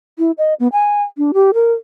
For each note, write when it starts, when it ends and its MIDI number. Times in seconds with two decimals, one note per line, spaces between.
0.18 0.31 64
0.38 0.54 75
0.60 0.68 59
0.72 1.02 80
1.18 1.32 62
1.34 1.51 67
1.54 1.72 70